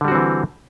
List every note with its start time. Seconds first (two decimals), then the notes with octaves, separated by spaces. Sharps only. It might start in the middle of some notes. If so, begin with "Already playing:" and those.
0.01 D3
0.05 G3
0.08 F#4
0.12 C4
0.15 E3